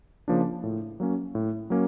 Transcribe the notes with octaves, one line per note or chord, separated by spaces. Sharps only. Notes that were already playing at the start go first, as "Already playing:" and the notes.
C#3 F3 A#3 D4
A2
F#3 A#3 C#4
A2
F#3 A#3 C#4